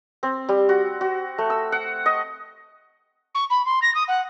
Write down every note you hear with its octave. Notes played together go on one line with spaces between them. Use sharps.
C4
G3
F#4
F#4
A3
E6
F#5
D#5
C#6
B5
C6
A#6
D#6
F#5